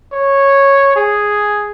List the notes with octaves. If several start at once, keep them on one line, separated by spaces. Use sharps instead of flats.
C#5
G#4